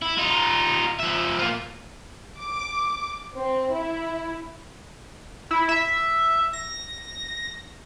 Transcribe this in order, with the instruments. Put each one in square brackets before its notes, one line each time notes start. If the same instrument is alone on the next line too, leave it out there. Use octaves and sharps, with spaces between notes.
[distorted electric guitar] E4
D#4 F4
F3 E5
A#3 F4
[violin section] D6
C4
E4
[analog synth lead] E4
E5
A#6